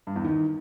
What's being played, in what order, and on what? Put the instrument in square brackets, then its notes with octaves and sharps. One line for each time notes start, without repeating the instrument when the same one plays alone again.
[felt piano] G2
E2
D#3